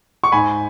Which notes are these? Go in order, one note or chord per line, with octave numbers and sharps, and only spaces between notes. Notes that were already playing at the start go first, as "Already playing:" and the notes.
C#6
G#2 G#5 B5